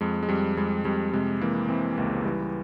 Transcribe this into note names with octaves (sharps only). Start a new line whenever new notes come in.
F2 G#3
G#3
F2 G3
F2 G#3
F2 G3
C3 G#3
E3 A#3
E3 C4
C#2 A#3
E3 G3